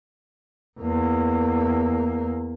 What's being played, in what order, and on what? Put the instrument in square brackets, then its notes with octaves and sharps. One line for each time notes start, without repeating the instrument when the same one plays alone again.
[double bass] E2 A#3